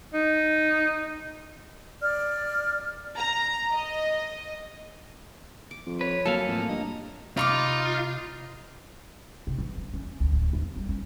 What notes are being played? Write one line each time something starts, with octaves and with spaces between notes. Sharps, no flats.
D#4
D5 F6
A#5
D#5
D6
F2
B4 C#5
F#3 A#3 A4 F5 G#5
F2 A2
G2 D#5
C3 D#4 F4 B5 C#6 D6
C3
E3
D4
C#4
D2
D1
E2
G3
C#4